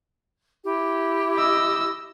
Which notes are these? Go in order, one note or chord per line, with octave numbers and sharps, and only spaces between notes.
E4 G4
D#5 E6